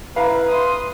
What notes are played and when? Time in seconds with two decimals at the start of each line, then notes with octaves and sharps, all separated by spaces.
0.16 E4 B4 F5 A#5
0.48 C6 D#6